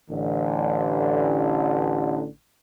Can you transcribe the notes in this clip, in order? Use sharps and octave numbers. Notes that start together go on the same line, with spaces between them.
A1 D3